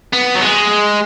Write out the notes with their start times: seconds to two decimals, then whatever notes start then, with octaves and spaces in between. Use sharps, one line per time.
0.13 B3
0.36 F#3
0.42 G#3